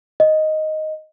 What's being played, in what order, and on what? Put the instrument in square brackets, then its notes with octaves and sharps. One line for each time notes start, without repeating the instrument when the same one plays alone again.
[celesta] D#5